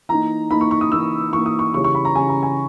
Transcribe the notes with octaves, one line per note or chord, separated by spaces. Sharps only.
E3 A#3 D#4 A#5
E3 A#3 D#4 B5
C#6
C#6
D#6
E3 A#3 D#4 E6
E3 A#3 D#4 C#6
D#6
C#6
C#3 E3 G3 C#4 C#6
C#6
B5
A#5
C#3 E3 G3 C#4 G#5
A#5
G#5